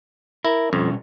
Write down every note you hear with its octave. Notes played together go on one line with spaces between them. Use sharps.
E4 A#4
F2 B2 G3 C#4